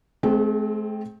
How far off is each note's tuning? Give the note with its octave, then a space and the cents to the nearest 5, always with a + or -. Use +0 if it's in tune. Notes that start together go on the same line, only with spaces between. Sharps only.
A3 -45 C4 +0 G#4 +0